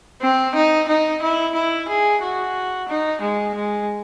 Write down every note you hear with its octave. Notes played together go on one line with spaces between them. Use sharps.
C4
D#4
D#4
E4
E4
G#4
F#4
D#4
G#3
G#3